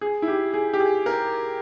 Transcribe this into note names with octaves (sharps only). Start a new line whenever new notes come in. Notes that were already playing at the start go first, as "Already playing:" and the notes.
G#4
E4
G4
G#4
G4
G#4
A#4